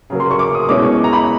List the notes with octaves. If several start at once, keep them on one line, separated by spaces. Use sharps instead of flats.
C#3 F#3 A#3
C6
C#6
D6
D#6
B2 G#3 C#4 E4 D6
C#6
A#5
B5